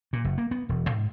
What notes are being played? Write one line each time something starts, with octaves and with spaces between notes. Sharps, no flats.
A#2
F#1
A#3
B3
E1
G#2